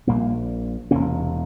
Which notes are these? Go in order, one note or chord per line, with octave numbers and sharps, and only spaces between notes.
A#1 A#2 G3 A#3
E1 E2 C3 A#3 C#4